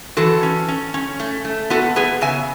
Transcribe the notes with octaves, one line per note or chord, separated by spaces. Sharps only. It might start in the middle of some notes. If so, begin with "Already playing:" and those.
E3 F#4 A4
C#4
C#4
C#4
A3
A3
B3 F#4 A4
B3 G#4 B4
C#3 E5 G#5